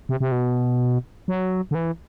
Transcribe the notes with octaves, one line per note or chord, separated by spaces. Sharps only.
C3
C3
B2
F#3
D3
E3